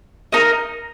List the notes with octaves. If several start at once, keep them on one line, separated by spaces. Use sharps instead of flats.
D#4 A#4 D#5